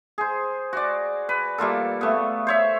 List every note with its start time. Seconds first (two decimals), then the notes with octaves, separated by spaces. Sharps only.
0.18 G#4 C5
0.73 F#4 D5
1.29 B4
1.58 G3 A#3 F4 A4
2.01 A3 B3
2.47 C5 C#5 E5